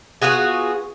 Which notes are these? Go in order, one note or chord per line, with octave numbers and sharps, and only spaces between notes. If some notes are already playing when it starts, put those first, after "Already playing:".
B3 F4 F#4 G#4